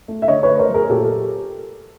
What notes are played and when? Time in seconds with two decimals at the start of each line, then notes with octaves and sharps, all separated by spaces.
0.08 A3
0.22 E5
0.28 D3 C#5 D#5
0.43 B4 C#5
0.49 A3
0.59 A#4 C5
0.69 F#3
0.74 G#4 A#4
0.89 A#2 G4 A4